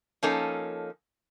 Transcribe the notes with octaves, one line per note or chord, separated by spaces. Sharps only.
F3 A#3 C#4 D#4 A4